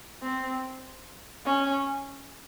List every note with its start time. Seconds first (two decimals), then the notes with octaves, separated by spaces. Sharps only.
0.22 C4
1.46 C#4